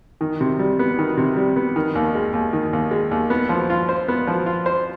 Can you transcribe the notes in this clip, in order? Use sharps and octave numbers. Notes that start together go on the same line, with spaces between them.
D#3
C3
G3
B3
D#3
C3
G3
B3
D#3
D#2
G#3
D#2
D#3
D#2
G#3
D#2
B3
F3
F4
C5
B3
F3
F4
C5